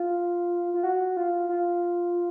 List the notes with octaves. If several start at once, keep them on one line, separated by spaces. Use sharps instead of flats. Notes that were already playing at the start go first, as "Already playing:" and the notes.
Already playing: F4
F4
F#4
F4
F4